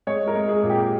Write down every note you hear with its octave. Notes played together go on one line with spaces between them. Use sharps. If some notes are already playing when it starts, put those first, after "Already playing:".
G#3 C#5
A#4
G#3
G#4
A#2
G4